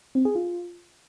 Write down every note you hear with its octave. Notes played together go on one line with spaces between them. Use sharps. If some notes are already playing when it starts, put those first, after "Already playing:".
C4
G#4
F4